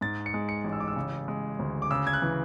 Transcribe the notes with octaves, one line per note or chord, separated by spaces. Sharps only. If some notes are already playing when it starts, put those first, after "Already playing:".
G#2 A6
C#7
G#3
C#7
A1
E6
D6
E6
C#3
G#3
D2
D6
C#3 E6
G#6
F#6
E3